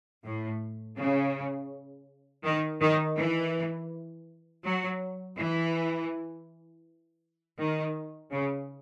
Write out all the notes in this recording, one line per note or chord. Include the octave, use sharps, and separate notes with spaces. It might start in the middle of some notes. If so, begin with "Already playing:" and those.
A2
C#3
D#3
D#3
E3
F#3
E3
D#3
C#3